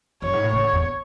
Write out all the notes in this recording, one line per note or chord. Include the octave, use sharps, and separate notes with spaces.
F#2 C#5
G#2
A2
C#3 C#5
D3
E2